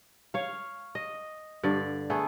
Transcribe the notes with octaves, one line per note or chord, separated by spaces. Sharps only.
C#5 F5
D#5
G2 D3 D5
A3 B3 G#4